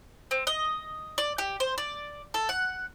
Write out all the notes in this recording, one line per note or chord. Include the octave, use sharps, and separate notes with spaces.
C4
D#5
D5
G4
C5
D5
A4
F#5